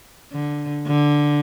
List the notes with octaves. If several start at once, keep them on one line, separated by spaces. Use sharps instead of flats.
D3
D3